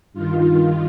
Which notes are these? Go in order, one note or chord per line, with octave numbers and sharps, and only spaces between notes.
G2 D#3 F4